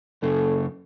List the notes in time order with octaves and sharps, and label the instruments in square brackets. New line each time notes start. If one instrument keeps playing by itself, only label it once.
[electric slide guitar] F#2 C#3 [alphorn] A4